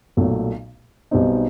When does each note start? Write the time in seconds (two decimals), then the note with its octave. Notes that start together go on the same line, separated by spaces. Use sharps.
0.17 B1 A#2 F#3 A3
1.11 B1 B2 G3 C4 D#4